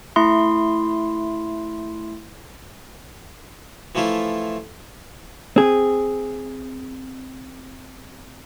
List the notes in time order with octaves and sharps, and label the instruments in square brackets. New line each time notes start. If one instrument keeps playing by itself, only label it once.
[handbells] A3 E4 C6
[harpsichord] E3 F3 A3 E4 F4
[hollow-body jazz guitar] C4 G#4